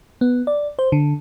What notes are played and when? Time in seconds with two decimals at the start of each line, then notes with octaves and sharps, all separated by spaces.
0.21 B3
0.47 D5
0.79 C5
0.92 D3